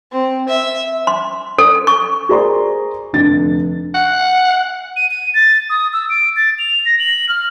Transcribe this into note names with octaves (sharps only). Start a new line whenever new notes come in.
C4
E5
C6
A4
C#6
G#4 A#4 C5 D5 A#5 C6
F1 D3 D4 A6
F#5
D#7
D#7
A6
D#6
E6
D7
A6
F7
A#6
F#7
F6